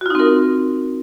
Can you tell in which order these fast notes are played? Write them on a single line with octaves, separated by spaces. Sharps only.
F#4 F4 D#4 C4 A#4